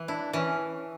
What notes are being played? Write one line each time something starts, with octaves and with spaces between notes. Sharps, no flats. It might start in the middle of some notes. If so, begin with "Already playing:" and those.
Already playing: E3
D4 E4
E3 C#4